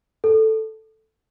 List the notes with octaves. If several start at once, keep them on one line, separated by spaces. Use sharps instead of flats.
A4